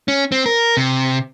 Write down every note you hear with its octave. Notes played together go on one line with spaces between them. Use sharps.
C#4
C4
A#4
C3